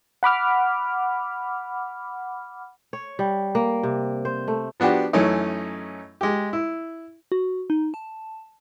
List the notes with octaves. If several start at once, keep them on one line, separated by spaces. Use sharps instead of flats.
F#5 B5 D6 F6
C#5
G3
A#3
C3
C5
A3
F3 B3 D4 F#4 G4
F#2 E3 A3 C#4 D#4
G#3 G4
E4
F#4
D#4
A5